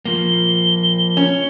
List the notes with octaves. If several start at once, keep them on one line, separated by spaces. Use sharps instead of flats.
F3 A#3 G7
C#4